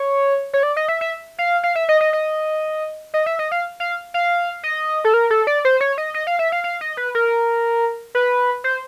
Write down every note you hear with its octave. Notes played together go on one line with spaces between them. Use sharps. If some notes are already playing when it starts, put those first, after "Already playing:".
Already playing: C#5
C#5
D5
D#5
E5
E5
F5
F5
E5
D#5
D#5
D#5
D#5
E5
D#5
F5
F5
F5
D#5
A4
A#4
A4
D5
C5
C#5
D#5
D#5
F5
E5
F5
F5
D#5
B4
A#4
B4
C5